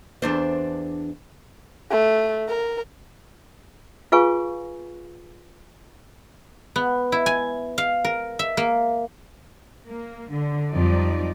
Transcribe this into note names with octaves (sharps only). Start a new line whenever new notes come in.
E2 D4 C5
A3
A#4
F4 G#4 B4 F5 G#5 C#6
B3
E4
G#5
F5
A#4
E5
A#3
A#3
D3
F2 F#3 G3 D#4 D5